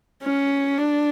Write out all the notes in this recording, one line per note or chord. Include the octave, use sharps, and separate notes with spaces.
C#4
D4